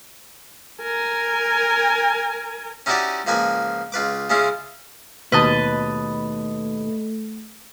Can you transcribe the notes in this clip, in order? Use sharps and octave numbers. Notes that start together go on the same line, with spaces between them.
A#4 G#5
C#4 D#4 E4 F#4 G4 D5
C#2 F3 A#3 B4 G#5
C#2 F4 B4 D6
C#3 G#3 C#4 E4 F4
D#2 B2 A3 B4 D#5 A5